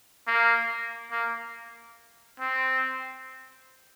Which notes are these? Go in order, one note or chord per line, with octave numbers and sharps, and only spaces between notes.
A#3
A#3
C4